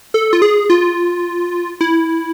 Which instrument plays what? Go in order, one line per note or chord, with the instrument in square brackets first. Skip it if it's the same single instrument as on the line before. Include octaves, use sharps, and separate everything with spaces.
[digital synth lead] A4
F4
G#4
F4
E4